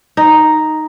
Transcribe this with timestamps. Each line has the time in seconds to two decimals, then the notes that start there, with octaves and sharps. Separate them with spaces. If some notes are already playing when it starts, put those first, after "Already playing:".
0.17 D#4